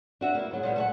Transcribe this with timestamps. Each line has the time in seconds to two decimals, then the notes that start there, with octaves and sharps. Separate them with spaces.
0.21 D4 F#4 E5
0.35 A#3 E4
0.51 G#2 F#3 G#4
0.63 A#2 G3 B3
0.76 A3 C#5 F#5